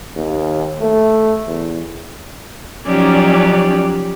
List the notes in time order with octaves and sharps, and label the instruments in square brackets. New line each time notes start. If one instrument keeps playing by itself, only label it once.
[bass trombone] D#2
A3
E2
[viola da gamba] F3 F#3 G4 [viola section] C#4 D#4 D5